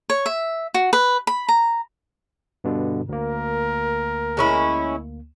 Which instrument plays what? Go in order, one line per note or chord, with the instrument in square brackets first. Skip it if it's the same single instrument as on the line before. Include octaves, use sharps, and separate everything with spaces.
[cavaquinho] C#5
E5
F#4
B4
B5
A#5
[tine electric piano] G2 B2 D3
[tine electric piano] D2 A#3 [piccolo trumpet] A#4
[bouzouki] G#3 C#4 E4